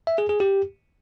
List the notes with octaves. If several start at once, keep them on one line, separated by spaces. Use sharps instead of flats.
E5
G#4
G#4
G4